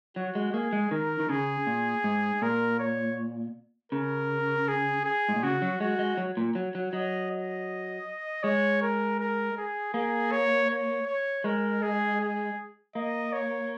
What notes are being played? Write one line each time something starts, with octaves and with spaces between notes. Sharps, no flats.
F#3 F#4
G#3
A#3 G#4
G#3
D#3 A#4
D#3
C#3 G#4
A#2
G#2
A#2 A#4
C#5
C#3 A#4
G#4
G#4
G#2
A#2
C#3 F#4
F#3
G#3 F#4
G#3
F#3
A#2
F#3
F#3
F#3 D#5
D#5
G#3 C#5
A#4
A#4
G#4
A#3 G#4
C#5
C#5
C#5
G#3 A#4
G#4
G#4
A#3 D#5
C#5